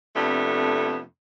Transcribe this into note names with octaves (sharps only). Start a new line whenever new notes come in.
F2 C3 A3 B3 D4